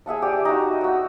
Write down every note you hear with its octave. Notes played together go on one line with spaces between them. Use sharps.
G#4 E5 F#5 A5
G4 D5
D#4 F#4
F#4 E6